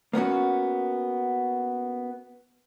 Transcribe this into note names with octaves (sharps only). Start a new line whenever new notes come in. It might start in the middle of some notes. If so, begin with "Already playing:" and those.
A#3 B3 C#4 F#4